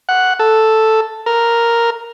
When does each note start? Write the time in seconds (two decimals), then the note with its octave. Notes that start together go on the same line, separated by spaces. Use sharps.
0.09 F#5
0.39 A4
1.26 A#4